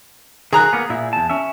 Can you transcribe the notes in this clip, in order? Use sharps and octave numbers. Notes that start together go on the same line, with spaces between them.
D#3 F#3 G#4 A#5 F#6
A#3 B3
A#2 E4
E2 A5
C#4 E5